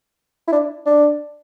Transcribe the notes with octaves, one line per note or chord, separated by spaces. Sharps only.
E4
D4
D4